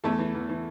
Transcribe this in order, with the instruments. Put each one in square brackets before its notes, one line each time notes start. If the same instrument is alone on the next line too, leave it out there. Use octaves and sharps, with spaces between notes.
[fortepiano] E2 A3 A4
E3
E2
E3